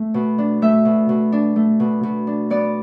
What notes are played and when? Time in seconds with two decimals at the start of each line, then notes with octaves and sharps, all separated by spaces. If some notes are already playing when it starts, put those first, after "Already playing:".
Already playing: A3
0.14 B2
0.38 D4
0.62 A3 E5
0.85 B2
1.09 B2
1.32 D4
1.56 A3
1.80 B2
2.03 B2
2.27 D4
2.50 B3 D5